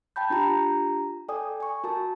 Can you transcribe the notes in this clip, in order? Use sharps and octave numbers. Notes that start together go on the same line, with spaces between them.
G5 A5 B5 G6
D4 F4 G4 A#5
A4 D5 G5 G#5 D#6
G#5 C#6
F#4 A#4 A5